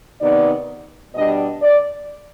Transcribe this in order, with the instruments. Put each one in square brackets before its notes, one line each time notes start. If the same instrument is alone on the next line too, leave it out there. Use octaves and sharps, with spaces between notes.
[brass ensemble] C3 D#3 B3 D#4 D5
B2 G3 D4 D#5
D5